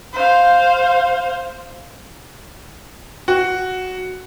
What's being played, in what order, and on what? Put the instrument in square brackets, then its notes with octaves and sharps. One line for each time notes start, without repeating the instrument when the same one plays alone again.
[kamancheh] C5 F5
[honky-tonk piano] F#4